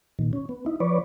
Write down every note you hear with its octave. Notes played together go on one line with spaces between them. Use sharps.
A#2 D#3
C#4
B3
D#4 E4
F3 B4 C#5 D5